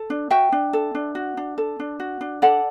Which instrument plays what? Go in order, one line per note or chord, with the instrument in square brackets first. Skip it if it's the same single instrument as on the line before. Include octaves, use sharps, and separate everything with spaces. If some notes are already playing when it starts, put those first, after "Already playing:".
Already playing: [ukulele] A4
D4
F#4 E5 G5
D4
A4
D4
F#4
D4
A4
D4
F#4
D4
A4 D5 F#5